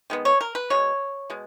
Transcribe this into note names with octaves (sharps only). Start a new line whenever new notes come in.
D#3 G#3 B3
C#5
A#4
B4
B2 G#3 C#5
B2 G#3